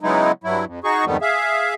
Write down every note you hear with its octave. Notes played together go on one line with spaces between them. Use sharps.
C#3 F#3 G#3 B3 D#4 E4
G2 F#3 E4
F2
D#4 F#4 G#4 C#6
F2 G#2 D#3 G3 A3 B3
G#4 E5 F5